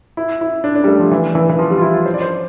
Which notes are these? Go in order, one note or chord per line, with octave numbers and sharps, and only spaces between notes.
E4
E4
D4
D4
G3
A3
F3
E3
E3
E3
F3
G3
F4
E4
F4
C5
D5
C5